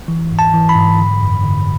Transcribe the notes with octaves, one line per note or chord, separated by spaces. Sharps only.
E3
G#2
A5
E3
B5
G#2
D3
F#2
D3